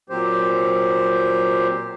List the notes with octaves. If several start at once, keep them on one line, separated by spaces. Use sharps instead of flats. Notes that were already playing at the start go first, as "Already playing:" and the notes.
A#2 F#3 C4 G4 C5